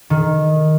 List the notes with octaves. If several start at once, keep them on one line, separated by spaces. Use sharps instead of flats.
D#3